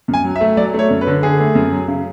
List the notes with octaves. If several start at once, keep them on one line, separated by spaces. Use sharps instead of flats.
F#2
G#5
F#3
E5
A3
F#3 D5
A3 C#5
F#2
B4
D3
D3 G#4
A3
F#2
F#3
C#3